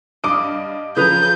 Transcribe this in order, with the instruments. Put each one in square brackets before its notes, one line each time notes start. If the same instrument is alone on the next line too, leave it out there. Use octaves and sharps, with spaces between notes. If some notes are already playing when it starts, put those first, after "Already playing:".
[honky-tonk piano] G2 D7 [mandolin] D#5 F5 [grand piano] D6 D#6
[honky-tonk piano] C#3 F3 [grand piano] F4 B4 [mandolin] A#5 D#6 [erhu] G6